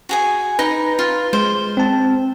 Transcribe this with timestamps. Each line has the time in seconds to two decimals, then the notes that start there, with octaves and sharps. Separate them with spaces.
0.09 F#4 G#4 G#5
0.59 D#4 B4 A#5
0.99 F4
1.33 G#3 C5
1.77 C4 A5